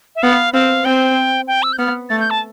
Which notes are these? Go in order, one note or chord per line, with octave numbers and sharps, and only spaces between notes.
E5
B3 F5
C4 F5
C4 G5
G5
E6
G6
B3 F6
A3 A6
G6
A5